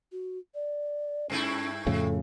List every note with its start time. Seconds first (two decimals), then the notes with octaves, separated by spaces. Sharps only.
0.12 F#4
0.54 D5
1.30 G2 A3 C#4 E4
1.87 F2 A2 C#3 A4